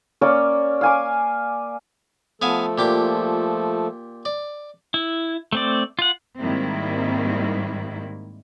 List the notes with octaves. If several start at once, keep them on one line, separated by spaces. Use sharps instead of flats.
A#3 C#4 C#5 D5
F5 G#5 D6
F3 A3 B3 A4 F5 G#5
A#2 G4 D6
D5
E4
A3 C4 D5
F4 F#5
G#2 D#3 G3 A#3 C4 E4